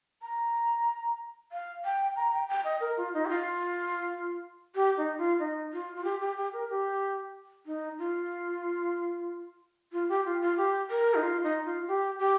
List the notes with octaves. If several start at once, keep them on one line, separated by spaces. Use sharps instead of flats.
A#5
F5
G5
A#5
G5
G5
D#5
A#4
F4
D#4
G4
F4
G4
D#4
F4
D#4
F4
F4
G4
G4
G4
A#4
G4
D#4
F4
F4
G4
F4
F4
G4
A#4
D#4
F4
D#4
F4
G4
G4